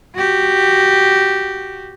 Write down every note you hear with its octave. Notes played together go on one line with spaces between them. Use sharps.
F#4 G4